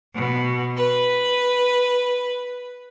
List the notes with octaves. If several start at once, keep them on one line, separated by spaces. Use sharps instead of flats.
B2
B4